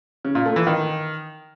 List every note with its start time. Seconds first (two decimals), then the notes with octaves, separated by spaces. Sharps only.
0.25 C#3
0.35 A#2
0.46 A3
0.56 E3
0.67 D#3